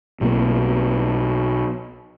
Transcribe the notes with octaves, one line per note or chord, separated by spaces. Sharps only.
B1 B2 A#3 C4